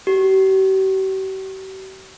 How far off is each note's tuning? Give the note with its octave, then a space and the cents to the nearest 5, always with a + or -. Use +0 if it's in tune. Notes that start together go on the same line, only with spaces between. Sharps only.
G4 -45